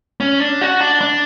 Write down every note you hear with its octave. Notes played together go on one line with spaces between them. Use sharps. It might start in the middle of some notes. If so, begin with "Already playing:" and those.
C#4
D4
F#4
D4
D4